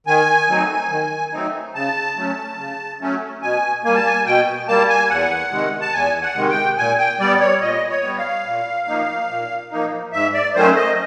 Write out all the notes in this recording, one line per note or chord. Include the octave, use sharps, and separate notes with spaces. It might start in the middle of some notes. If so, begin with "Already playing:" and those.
D#3 G#5
F#3 A3 C4 D#4
D#3
F#3 A3 C4 D#4
C#3 A5
F#3 A3 C#4
C#3
F#3 A3 C#4
B2 G#5
G3 A#3 G#5
A5
G#5
B2 G5
G3 A#3 A5
G#5
E2 F#5
C3 D#3 G#3
A5
E2 G#5
F#5
C3 D#3 G#3
G5
A#2 G#5
G5
G3 B3 D5
C#5
A#2 D#5
C#5
G3 B3
F5
A#2
F3 A#3 D#4
A#2
F3 A#3 D#4
G#2 E5
D5
D#3 F#3 A3 C#4 C5
D#5